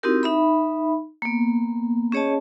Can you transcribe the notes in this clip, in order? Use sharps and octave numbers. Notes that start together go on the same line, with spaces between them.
C4 D#4 E4 F#4 G4 A#4
D#4 E5 B5
A#3 B3
C#4 G#4 C#5 D#5 A5